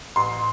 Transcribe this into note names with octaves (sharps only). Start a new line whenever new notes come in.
A1 C6